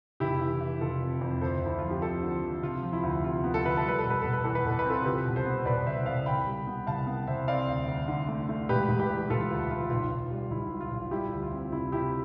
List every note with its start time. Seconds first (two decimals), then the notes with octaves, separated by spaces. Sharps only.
0.20 F1 E4 G4
0.41 E3
0.61 E3
0.81 F1 F4 A4
1.02 F2
1.21 F2
1.41 D2 A4 C5
1.61 D2 E4
1.79 F3 F4
1.91 G4
2.02 F3 F4 A4
2.23 D3
2.43 F3
2.62 C3 F4
2.83 F3
2.93 E4
3.03 D2
3.24 C3 F4
3.44 B3
3.54 A4
3.64 D2 B4
3.77 A4
3.84 G3 B4
3.99 A4
4.04 B2
4.10 B4
4.21 B2 A4
4.33 B4
4.44 E2 A4
4.55 B4
4.65 B2 A4
4.79 B4
4.85 C4 F4 A4
5.05 C2 G4 B4
5.26 B2
5.36 A4 C5
5.46 B3
5.65 B2 B4 D5
5.86 C2 C5 E5
6.06 C2 D5 F5
6.26 C2 G5 B5
6.46 G3
6.67 B3
6.87 C2 F5 A5
7.07 B3
7.27 C2 C5 E5
7.48 C4 D5 F5
7.68 D2
7.88 D2
8.08 D3
8.28 A3
8.49 A3
8.69 E1 G4 B4
8.89 E1
9.00 G4 B4
9.10 E3
9.30 E1 F4 A4
9.50 D2
9.70 E3 F4
9.90 B1 F4
10.11 B1
10.31 G3
10.50 B1 E4
10.71 G3
10.81 F4
10.91 B1
11.11 G3 E4 G4
11.32 D2
11.42 F4
11.52 C4
11.72 C3 E4
11.92 C3 E4 G4